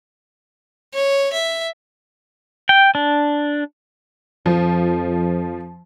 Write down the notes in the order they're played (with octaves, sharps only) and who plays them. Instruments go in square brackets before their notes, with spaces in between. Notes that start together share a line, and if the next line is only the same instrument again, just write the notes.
[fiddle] C#5
E5
[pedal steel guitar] G5
D4
[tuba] F2 [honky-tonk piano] F3